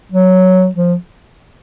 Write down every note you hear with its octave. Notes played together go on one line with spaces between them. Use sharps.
F#3
F3